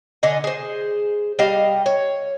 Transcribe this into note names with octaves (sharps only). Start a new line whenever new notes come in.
D3 D#5 G#5
G#4 C5
G3 D#5 F5
C#5